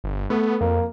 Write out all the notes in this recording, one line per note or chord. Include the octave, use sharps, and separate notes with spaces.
G1
A3 B3
F2 A#3